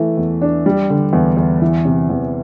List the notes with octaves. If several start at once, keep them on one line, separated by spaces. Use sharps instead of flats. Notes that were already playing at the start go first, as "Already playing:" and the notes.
Already playing: E3 A3
E2
D4
G3
D3
E2
E2
E3
C3
E2